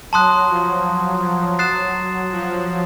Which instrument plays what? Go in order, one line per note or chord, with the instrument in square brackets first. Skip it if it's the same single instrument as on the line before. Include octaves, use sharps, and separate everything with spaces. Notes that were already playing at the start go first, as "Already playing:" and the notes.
[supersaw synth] F#3 [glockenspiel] A5 C6 D#6 F#6
[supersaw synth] F3
F3
[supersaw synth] F#3 [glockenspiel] D#6 F#6 A6 C7 E7
[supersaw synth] F3